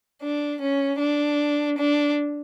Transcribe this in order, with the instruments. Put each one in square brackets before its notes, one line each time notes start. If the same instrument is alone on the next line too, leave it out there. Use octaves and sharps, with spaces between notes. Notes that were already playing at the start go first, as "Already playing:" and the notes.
[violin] D4
C#4
D4
D4